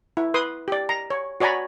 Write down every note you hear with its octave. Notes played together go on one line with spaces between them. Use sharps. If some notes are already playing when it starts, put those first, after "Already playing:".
E4
B4 C6 D#6
G4 D5
A#5
C#5
F#4 C#5 D5 G#5 A#5 B5